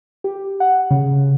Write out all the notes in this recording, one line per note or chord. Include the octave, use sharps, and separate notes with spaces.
G4
F#5
C#3